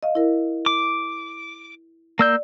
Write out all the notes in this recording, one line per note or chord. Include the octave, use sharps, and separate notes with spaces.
D#5 F5
E4 A#4
D6
A#3 D5 E6 G6